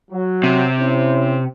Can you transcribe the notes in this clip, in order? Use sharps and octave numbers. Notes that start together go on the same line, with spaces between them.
F#3
C3
C#4 E4 C5